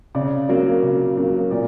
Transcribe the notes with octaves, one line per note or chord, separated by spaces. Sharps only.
C#3 D5
F#3 A#3
C#3
F#3 A#3
A#2 D5